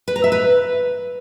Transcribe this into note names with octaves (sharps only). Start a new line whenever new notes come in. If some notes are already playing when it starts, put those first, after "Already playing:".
B4
A#5
E5
B4